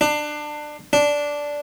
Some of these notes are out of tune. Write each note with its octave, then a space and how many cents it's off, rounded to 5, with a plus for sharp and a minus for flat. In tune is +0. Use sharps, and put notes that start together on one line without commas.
D4 +25
D4 -5